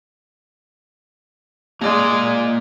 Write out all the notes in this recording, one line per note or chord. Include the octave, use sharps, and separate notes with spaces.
G#3 A#3 D5